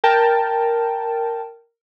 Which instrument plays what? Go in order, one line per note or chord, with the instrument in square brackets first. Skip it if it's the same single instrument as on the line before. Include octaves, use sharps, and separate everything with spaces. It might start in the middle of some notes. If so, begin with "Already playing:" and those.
[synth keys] A#4 G5 A5